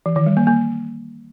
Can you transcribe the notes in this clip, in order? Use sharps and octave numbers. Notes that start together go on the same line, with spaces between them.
E3
D#3
G3
A#3
A#3